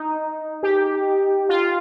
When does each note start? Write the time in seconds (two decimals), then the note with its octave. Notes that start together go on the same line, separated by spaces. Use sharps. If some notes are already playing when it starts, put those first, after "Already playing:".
Already playing: D#4
0.63 G4
1.49 F4